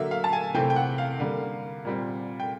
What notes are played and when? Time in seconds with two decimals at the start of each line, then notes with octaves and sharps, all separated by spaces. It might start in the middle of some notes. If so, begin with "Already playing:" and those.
Already playing: D3 F#3 A#3 E5
0.11 F5
0.24 A5
0.33 G#5
0.54 C3 E3 A3 C4 G5
0.70 G5
0.76 F#5
0.98 F5
1.20 D3 G3 A#3
1.85 A#2 G3 C4
2.40 G5